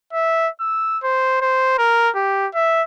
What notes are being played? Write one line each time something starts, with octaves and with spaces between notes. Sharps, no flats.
E5
E6
C5
C5
A#4
G4
E5